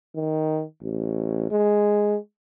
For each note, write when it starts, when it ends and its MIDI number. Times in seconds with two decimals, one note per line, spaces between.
0.15 0.63 51
0.82 1.51 33
1.51 2.16 56